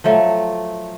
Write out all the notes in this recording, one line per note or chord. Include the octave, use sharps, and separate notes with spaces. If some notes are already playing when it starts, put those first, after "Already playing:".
F3 F#3 A3